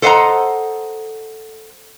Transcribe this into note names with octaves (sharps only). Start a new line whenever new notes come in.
A4 C5 D#5 F5 F#5 A#5